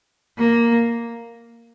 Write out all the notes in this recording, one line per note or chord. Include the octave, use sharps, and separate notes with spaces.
A#3